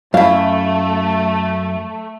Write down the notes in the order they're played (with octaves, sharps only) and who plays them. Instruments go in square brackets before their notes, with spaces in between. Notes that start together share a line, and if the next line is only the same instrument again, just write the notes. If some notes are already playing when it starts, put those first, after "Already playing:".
[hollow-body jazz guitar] F#2 E4 [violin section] A3 [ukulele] F5